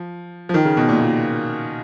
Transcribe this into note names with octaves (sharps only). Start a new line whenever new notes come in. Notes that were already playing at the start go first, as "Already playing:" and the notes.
Already playing: F3
F3
D#3
C#3
B2
A#2
A#2